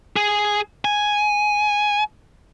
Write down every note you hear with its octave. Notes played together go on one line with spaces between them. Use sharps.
G#4
G#5